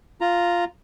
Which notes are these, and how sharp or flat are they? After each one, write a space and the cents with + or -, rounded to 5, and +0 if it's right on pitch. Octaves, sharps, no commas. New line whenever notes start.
F4 +0 A#5 +0